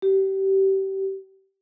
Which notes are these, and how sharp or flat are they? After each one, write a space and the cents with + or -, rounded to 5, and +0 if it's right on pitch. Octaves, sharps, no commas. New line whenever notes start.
G4 -25